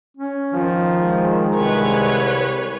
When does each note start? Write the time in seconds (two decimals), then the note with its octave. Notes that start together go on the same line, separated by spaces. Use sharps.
0.17 C#4
0.54 D#3 F3
1.01 G#3
1.56 C2 B4 C#5